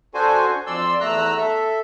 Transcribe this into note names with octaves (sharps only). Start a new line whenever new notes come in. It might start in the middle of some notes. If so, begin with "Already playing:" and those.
D4 F#4 A4 C5 G#5
F2 D5 C6 E6
E2 A3 A#5 E6 F#6
A4 E5